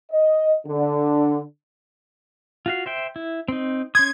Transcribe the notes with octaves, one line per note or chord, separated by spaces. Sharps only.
D#5
D3
F4 F#4 F5
C5 E5 G5
E4
C4 D#4
C#4 C6 D#6 G#6